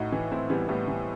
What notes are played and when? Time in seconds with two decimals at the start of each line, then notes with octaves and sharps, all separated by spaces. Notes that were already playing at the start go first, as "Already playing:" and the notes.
Already playing: A2 D#4 F#4
0.12 E3
0.31 A2 C4 E4
0.50 E3 G3 B3
0.68 A2 G3 B3
0.88 E3